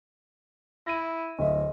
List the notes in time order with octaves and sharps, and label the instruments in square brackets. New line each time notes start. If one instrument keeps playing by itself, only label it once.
[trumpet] E4 [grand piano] A#6 D#7
[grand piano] D1 A2 E5 [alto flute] D#5